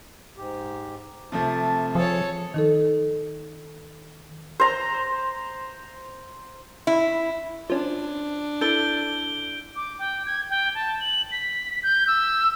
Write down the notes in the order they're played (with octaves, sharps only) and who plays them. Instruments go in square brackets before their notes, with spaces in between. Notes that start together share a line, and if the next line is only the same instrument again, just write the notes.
[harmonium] G#2 G4
[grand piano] C3 F3 A3 [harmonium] A5
[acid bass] F3 [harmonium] G#4 [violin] A4 C#5
[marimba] D#3 D#4 A4
[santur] C5 A#5
[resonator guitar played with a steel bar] E4
[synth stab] F3 C#4 [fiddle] D4 [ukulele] C5
[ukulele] E4 A4 [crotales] G6 D7 G7
[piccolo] D6
G5
G#6
G5
A5
F#7
B6
G6
E6